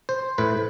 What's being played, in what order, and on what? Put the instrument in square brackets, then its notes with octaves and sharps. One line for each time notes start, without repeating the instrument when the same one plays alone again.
[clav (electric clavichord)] C5
A2 B4